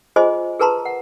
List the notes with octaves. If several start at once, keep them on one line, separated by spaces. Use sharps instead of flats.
F4 G#4 C5 D#5 G#5 C6
G#4 A#4 B4 A5 A#5 C6
F#5